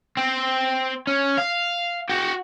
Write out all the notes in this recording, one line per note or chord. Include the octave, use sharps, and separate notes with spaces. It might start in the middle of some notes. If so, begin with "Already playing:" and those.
C4
C#4
F5
F#4 G5